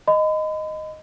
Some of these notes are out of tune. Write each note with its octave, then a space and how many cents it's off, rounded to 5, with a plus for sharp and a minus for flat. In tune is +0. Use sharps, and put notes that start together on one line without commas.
D#5 +0 B5 +40